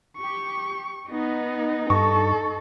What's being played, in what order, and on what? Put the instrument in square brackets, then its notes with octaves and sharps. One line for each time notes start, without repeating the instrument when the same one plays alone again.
[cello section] G4 [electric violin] C#6
[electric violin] B3 [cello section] D#4
[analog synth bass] G2 [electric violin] A4 [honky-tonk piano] C#6